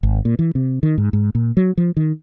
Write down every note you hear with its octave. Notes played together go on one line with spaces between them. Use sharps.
G#1
A#2
E3
C3
D#3
G#2
G#2
A#2
F#3
F3
D#3